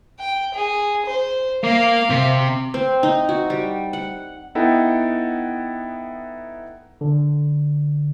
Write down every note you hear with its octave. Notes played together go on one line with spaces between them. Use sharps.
G5
G#4
C5
A#3 F5
C3
C4
D#4
F#4
G3
F#5
B3 D#4 E4 A4 F#5 G5
D3